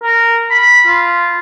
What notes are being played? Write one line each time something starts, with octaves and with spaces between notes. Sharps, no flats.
A#4
B5
F4